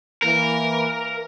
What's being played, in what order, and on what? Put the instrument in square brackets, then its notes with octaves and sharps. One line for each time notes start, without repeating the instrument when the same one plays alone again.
[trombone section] E3 A#3 [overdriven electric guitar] A#4